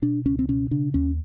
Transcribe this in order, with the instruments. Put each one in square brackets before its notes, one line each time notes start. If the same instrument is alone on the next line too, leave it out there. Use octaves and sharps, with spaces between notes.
[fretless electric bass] B2 D4
C#2 C#4
C4
B2 C#4
C#3 D4
D#2 C#4